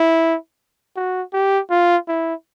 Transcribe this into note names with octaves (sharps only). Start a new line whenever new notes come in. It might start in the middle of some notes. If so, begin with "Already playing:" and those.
Already playing: E4
F#4
G4
F4
E4